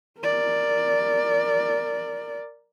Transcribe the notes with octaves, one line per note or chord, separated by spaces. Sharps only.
A#4 D5